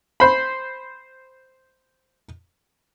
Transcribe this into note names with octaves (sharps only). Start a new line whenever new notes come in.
C5 B5